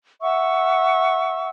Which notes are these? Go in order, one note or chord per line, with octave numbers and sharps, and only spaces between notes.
E5 F#5 C#6 E6